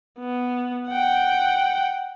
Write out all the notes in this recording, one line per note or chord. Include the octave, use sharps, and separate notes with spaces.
B3
F#5 G5